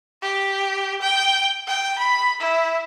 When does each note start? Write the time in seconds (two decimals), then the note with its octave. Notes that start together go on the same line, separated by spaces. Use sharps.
0.22 G4
1.02 G5
1.68 G5
1.99 B5
2.40 E4